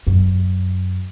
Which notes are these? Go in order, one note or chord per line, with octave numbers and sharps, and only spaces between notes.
F#2